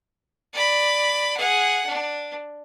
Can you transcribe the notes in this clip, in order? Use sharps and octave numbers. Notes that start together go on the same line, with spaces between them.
D5 B5
G#4 F#5
D4